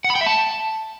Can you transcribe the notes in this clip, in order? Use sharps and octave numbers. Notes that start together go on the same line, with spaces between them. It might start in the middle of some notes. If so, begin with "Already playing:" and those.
F#5
B5
G5
E5
A5